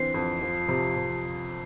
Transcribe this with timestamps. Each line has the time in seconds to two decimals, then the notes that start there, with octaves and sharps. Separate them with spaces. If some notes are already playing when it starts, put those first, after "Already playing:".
Already playing: D3 E3 C4 C7
0.14 F2
0.42 F3
0.68 C3
0.96 C3